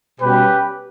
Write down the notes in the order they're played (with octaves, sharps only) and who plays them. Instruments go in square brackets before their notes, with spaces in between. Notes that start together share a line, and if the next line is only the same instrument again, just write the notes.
[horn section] B2 G3 C#4 G4 B4